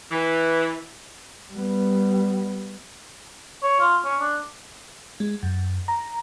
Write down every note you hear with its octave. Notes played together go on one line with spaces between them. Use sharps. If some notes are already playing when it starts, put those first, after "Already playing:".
E3
G3 B3
C#5
F4
C#4
D4
G#3
F#2
A#5